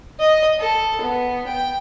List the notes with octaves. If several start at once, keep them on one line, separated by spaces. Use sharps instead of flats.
D#5
A4
B3
G5